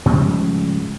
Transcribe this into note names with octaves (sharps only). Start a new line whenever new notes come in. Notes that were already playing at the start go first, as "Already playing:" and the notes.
G#2 C#3 F3 G3